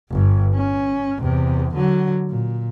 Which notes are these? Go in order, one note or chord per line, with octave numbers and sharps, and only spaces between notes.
G1 G2
C#4
E2 C3
D3 F#3
A#2